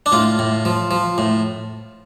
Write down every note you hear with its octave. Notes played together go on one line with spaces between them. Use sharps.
D4
A2 F4
A2
F3
F3
A2